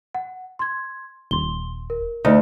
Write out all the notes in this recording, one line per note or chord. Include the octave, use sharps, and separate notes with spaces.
F#5
C6 G#6
D#1 C6 G7
A#4
D2 D#4